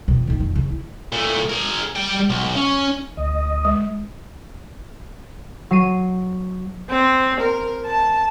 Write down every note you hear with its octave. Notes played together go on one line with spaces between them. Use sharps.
F2 B2
A#1 D#3
F2
C#3
E4
A#2 A3
G#4 A#4
G3 G5
B1
C#4
D2 D#5
G#3
F#3 C7 D#7
C4
A#4
A5